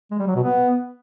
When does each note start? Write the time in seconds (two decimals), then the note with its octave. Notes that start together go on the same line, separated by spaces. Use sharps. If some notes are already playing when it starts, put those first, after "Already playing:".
0.11 G#3
0.19 G3
0.27 F#3
0.36 B2
0.44 B3